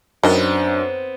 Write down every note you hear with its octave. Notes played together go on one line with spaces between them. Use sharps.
F#2 D#3 B3 C4 D4 D#5